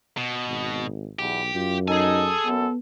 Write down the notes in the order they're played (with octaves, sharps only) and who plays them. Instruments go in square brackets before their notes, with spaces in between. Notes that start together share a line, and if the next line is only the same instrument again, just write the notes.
[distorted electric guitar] B2
[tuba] G#1
[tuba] B1 [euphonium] E2 [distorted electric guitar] G4
[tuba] F#2 [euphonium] F4
[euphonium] D#4 [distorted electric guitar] G#4 G#5 [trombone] A4
[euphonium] F#2 [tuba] B3